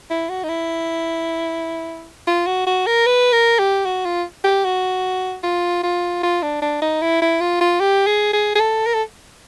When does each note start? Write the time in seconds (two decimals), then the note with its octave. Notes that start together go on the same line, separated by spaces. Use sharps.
0.10 E4
0.29 F#4
0.44 D#4
0.49 E4
2.27 F4
2.47 F#4
2.67 F#4
2.87 A#4
3.06 B4
3.33 A#4
3.59 G4
3.85 F#4
4.05 F4
4.44 G4
4.64 F#4
5.43 F4
5.83 F4
6.23 F4
6.43 D4
6.62 D4
6.82 D#4
7.02 E4
7.22 E4
7.41 F4
7.61 F4
7.80 G4
8.07 G#4
8.33 G#4
8.55 G#4
8.60 A4
8.86 A#4
8.94 A4